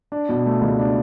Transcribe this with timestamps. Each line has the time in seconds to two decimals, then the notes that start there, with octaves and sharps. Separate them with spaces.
0.12 D4
0.29 B2
0.46 A3
0.62 C#2
0.79 D4